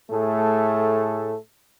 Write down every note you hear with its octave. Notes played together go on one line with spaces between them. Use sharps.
A2 A3 G#4 A4